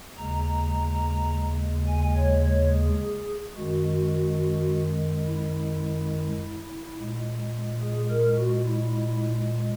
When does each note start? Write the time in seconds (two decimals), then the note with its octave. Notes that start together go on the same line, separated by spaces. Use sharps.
0.16 D#2 C#3 G#3 A#5
1.87 G#5
2.15 C#5
2.44 C#5
2.72 G#4
3.56 F#2 D#3 G#3 F#4
5.26 E4
6.96 A#2 G#3
7.81 G#4
8.10 A#4
8.38 F#4
8.66 E4